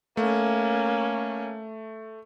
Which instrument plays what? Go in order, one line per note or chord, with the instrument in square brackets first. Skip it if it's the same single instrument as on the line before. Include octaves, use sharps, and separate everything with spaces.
[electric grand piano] A3 [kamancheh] A#3 C#4